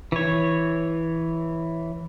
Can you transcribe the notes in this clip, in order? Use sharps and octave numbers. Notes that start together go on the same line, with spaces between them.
E3 C#5